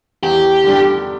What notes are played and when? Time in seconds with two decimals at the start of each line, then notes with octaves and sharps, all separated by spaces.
0.23 E2 G4
0.64 D3 G3 D4